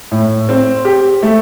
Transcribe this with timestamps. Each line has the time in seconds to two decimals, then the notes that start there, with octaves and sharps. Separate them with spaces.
0.12 A2
0.49 C4
0.85 G4
1.23 A3